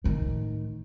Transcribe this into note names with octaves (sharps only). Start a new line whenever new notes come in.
A2 D#3